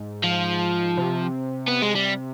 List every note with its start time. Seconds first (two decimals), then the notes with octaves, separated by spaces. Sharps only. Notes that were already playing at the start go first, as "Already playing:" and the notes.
Already playing: G#2
0.24 F3
0.97 C3
1.68 B3
1.82 G#3
1.95 G3